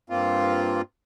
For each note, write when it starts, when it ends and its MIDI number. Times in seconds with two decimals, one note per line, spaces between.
0.10 0.81 43
0.10 0.81 58
0.10 0.81 60
0.10 0.81 65